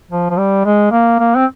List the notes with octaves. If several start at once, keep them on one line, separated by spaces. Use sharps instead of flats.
F3
F3
G3
G#3
A#3
A#3
C4